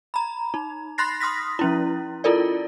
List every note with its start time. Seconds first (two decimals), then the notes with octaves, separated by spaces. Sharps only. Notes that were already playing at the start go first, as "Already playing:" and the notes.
0.14 A#5 B5
0.54 D#4
0.98 B5 C6 F#6 A6 A#6 C7
1.20 C6 D#6 F6 A#6 B6
1.59 F3 C#4 E4
2.24 E4 F4 A4 A#4 D5